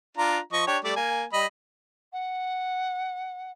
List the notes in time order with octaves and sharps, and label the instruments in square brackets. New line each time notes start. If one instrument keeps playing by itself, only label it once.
[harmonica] D4 F4 A#5
F3 D#5 C#6
D4 G4 C#5
G3 A3 D5
A#3 G#5
G3 D#5 B5
[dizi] F#5